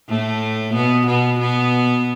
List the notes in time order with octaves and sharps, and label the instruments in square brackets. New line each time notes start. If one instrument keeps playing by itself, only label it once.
[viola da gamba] A2 A3
B2 B3
B2 B3
B2 B3